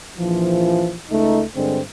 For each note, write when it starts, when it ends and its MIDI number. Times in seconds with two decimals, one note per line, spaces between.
0.18 0.97 34
0.18 0.97 52
0.18 0.97 53
1.10 1.43 37
1.10 1.43 57
1.10 1.43 63
1.56 1.81 43
1.56 1.81 50
1.56 1.81 56
1.56 1.81 60